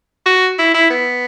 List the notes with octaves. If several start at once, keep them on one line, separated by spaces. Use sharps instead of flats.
F#4
E4
E4
B3